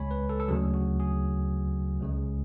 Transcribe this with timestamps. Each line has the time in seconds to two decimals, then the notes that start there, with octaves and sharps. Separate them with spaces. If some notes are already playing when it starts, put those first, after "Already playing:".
Already playing: C#2 C#3 G#3 C#5 G#5 B5
0.11 B4
0.29 A4
0.40 A4
0.48 D2 C#3 F#3 G#4
0.74 F#4
1.00 G#4
2.00 C#2 C#3 G#3